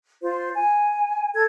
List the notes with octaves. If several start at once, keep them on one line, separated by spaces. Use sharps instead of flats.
F4 C5
G#5
A4 G#6